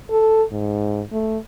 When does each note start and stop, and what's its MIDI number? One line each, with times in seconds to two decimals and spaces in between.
0.11 0.43 69
0.52 1.02 44
1.12 1.38 57